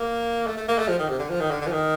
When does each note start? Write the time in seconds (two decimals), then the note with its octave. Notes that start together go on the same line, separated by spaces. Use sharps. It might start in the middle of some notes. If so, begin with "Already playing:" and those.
Already playing: A#3
0.47 A3
0.57 A3
0.68 A#3
0.78 A3
0.88 F3
0.99 D#3
1.09 C3
1.19 D3
1.30 F3
1.40 D#3
1.51 D3
1.61 D3
1.67 F3
1.72 D#3